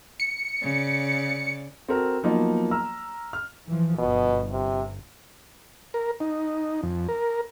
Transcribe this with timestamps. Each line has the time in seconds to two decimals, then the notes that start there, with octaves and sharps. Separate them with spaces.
0.20 C#7
0.61 C#3 D5
1.88 C4 F#4 A4 A#4
2.23 F3 F#3 A#3 B3 D#4 F4
2.71 A#5 E6 F6
3.33 F6
3.67 E3 F3
3.98 G1 B2
4.52 C3
5.94 A#4
6.20 D#4
6.83 F2
7.08 A#4